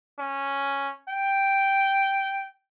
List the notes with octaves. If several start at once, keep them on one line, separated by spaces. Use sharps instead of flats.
C#4
G5